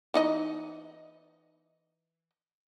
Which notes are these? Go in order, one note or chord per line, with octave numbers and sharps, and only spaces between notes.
E3 D#4 D#5